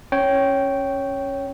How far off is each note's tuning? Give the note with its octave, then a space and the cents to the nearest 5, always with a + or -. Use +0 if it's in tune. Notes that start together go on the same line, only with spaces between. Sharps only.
C#4 -10 C#5 +0 G5 -10